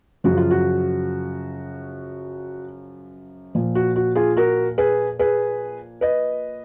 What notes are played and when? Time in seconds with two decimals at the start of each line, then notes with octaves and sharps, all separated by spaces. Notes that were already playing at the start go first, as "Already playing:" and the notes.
0.24 F#2 C#3 F3 F#4
0.37 F4
0.51 F#4
3.55 A#2 F3
3.75 F#4
3.96 F#4
4.15 F4 G#4
4.36 F#4 A#4
4.78 G#4 B4
5.19 G#4 B4
6.01 B4 D#5